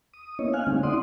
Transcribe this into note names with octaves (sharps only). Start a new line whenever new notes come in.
D#6
A#3 B3 C#4 E4 C#5 D#5
F5 G#5 F6 F#6
D3 G3 A3 C4 C#4 D#4
D#4 E4 D5 F#5 C6 D#6